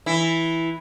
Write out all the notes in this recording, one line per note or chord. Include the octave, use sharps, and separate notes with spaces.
E3 E4